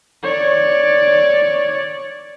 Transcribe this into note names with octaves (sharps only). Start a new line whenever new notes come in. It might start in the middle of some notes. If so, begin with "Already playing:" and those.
C#5 D5